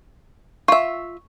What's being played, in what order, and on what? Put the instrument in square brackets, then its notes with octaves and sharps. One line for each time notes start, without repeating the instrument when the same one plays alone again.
[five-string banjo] F4 E5 [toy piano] C#6